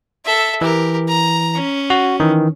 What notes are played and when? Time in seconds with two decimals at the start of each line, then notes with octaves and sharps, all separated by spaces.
0.25 A4 E5
0.61 E3 G4 A#4
1.08 A#5
1.55 C#4
1.90 F#4
2.20 D#3 E3